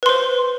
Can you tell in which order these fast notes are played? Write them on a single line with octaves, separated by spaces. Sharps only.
B4 C6 C5